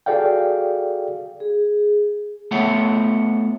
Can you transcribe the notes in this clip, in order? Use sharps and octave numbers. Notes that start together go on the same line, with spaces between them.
F#4 G#4 A4 D5 F5 G5
G#4
A3 B3 F4 C#5 E5 F#5